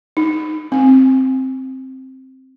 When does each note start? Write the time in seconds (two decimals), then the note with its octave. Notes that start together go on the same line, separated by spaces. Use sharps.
0.17 D#4
0.72 C4